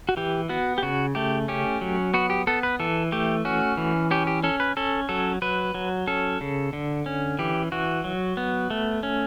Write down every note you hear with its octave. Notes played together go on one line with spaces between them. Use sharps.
F#4
E3 G4
B3 F#4
G4
C#3 F#4
A3 G4
C#4 G4
F#3
B3 F#4
G4
B3 A4
B4
E3 A4
A3 G4
C#4 F#4
E3
C#4 G4
G4
C#4 A4
B4
C#4 A4
F#3 A4
F#3 B4
F#3
C#4 A4
C#3
D3
C#4
E3 G4
E3 F#4
F#3
B3
A3
C#4